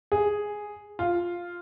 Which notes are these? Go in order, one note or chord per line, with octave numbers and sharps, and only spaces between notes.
G#4
F4